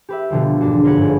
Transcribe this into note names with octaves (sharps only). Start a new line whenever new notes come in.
G4 B4 E5
B2 D3 F3 G3
E1 G#2 D4 F#4
F4 A#4 B4 C#5 F#5
G1 G#2